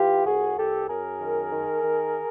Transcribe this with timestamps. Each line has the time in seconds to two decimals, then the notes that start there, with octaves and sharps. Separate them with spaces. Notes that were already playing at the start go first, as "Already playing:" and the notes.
Already playing: E3 F4 G4
0.25 C2 F#4 G#4
0.57 C2 G4 A4
0.88 F#2 G#4 A#4
1.19 D#3
1.51 D#3
1.83 D#3